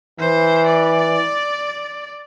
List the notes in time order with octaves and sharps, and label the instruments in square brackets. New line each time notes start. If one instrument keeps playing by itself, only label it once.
[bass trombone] E3 [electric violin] C5
[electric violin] D5